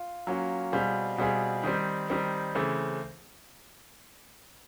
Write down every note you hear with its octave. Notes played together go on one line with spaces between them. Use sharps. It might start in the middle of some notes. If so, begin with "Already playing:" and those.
Already playing: F4
F#3 A#3 C#4 F4
B2 G3 C4 F4 G#4
B2 G3 C4 F4 G#4
D#3 G3 C4
D#3 G3 C4
C#3 E3 A3 C4